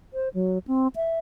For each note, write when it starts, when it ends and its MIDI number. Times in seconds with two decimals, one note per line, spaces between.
0.14 0.29 72
0.34 0.58 54
0.67 0.88 60
0.96 1.19 76